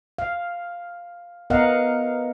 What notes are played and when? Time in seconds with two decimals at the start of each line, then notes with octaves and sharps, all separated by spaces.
0.18 F5
1.50 B3 A#4 D#5 F5 F#5